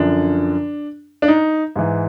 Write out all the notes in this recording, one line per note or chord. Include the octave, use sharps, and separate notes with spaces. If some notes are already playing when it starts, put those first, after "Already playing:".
Already playing: F#2 D3 F3 D4
D4
D#4
G#2 E3